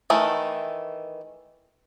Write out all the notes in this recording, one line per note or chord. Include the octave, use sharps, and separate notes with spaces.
D#3 E3 A3